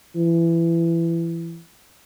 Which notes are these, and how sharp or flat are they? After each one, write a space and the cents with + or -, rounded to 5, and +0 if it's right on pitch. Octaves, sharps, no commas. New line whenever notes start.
E3 +20